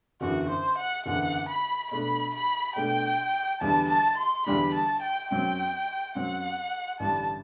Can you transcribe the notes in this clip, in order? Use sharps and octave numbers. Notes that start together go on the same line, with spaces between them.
F#1 E2 D3 F#4
C5
F#5
F#1 E2 D3 F#5
B5
B2 A3 D4 B5
B5
B2 A3 D4 G5
E2 D3 G3 D4 A5
A5
C6
E2 D3 G3 D4 B5
A5
G5
F#2 F#3 C4 G5
F#2 F#3 C4 F#5
A1 G2 D3 G3 D4 A5